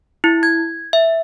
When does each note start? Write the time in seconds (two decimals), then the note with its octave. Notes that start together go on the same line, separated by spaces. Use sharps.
0.24 E4
0.43 G#6
0.93 E5